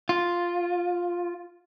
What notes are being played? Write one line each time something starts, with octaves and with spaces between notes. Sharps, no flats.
F4